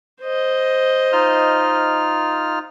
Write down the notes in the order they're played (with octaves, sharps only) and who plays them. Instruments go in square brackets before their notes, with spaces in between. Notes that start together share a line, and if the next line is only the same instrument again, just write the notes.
[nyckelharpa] C5 D#5
[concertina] D#4 F4 F6